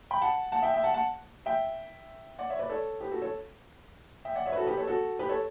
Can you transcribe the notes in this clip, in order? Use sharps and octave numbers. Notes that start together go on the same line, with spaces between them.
G5 B5
F#5 A5
F#5 A5
E5 G5
E5 G5
F#5 A5
F#5 A5
E5 G5
D5 F#5
C#5 E5
B4 D5
A4 C#5
G4 B4
F#4 A4
A4 C#5
E5 G5
D5 F#5
C#5 E5
B4
F#4 A4
G4 B4
A4 C#5
F#4 A4
G4 B4
A4 C#5